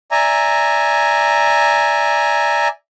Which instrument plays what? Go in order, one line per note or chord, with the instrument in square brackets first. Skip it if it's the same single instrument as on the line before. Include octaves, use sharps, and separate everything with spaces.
[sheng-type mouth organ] D5 E5 G#5 A#5